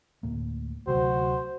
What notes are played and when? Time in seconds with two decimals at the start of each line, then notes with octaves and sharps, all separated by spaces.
0.23 D2 A2 A#3
0.87 D2 C3 F#3 F#4 C5